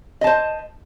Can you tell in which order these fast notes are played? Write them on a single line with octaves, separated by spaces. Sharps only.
D#5 A5 C5